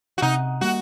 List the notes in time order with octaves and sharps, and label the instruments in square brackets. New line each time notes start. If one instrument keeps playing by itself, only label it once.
[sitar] F#4
[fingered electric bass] C3 [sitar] D#4
[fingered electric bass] G3 A#3 [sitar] F#4